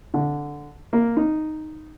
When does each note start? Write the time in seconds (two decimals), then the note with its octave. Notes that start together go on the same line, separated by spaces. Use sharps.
0.14 D3
0.93 A#3
1.17 D#4